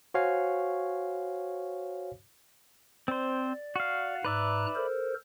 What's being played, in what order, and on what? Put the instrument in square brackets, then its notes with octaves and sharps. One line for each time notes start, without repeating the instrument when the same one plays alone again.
[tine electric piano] F#4 C5 C#5 F5 G#5
[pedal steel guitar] C4 C5 [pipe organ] D5
[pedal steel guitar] F#4 F5
[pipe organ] G#2 A#5 F#6 [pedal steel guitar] B4 D5 E5
[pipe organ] A4 A#4 C5